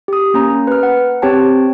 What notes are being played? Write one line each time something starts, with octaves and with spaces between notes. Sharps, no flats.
G4 D#6
A#3 C#4 A#5
B4 F6
F#5
C4 G4 C#5 G5 A5